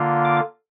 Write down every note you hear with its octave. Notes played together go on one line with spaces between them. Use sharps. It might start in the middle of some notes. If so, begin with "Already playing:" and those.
Already playing: D3 A#3 F4
D6